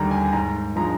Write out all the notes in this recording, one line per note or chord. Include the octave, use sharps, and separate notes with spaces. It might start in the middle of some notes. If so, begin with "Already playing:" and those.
Already playing: D#2 D3 G3 A#5
G#5
G#2 A#5
F3 G#3 D4 A#5